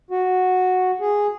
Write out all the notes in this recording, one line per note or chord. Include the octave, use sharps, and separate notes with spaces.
F#4
G#4